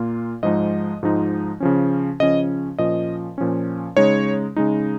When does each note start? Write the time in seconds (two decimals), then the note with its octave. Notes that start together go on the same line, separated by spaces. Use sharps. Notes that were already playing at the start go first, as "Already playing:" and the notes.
Already playing: A#2 A#3 F4
0.43 G#2 F3 G#3 D#4 D#5
1.03 G#2 F3 G#3 D#4
1.60 C#3 F3 C#4
2.20 C#3 F3 C#4 D#5
2.79 A#2 F3 C#4 D#5
3.38 A#2 F3 C#4
3.97 C#3 G#3 D#4 C#5
4.56 C#3 G#3 D#4